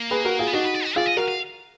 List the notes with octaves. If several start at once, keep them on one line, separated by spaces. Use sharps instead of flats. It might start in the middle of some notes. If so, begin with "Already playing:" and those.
Already playing: A#3
G#4 B4
F#4 A#4
F4 G#4
B3
D4 D#4 F#4
B4
D5
F#4
F4 G#4 D5
D#5
F#4 A#4 F5
F5